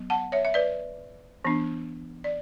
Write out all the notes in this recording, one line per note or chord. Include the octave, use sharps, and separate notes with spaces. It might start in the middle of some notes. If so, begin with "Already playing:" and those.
Already playing: F#3 B3
F#5 A5
C#5 E5
E5
B4 D5
E3 B3 D4
D5